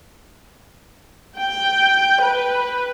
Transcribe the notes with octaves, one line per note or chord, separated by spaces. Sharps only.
G5
B4